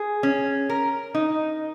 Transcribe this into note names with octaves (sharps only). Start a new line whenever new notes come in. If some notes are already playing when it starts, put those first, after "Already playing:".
Already playing: G#4
C#4
A#4
D#4